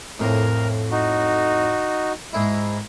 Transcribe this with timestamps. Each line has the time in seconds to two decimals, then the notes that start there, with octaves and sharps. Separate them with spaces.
0.19 F2 A2 A#4
0.91 D#4 F#4
2.33 G#2 E4